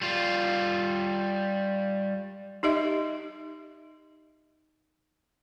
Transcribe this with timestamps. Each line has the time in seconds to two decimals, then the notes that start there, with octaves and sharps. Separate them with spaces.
0.01 G3 F4
2.63 D#4 G4 D#5 E5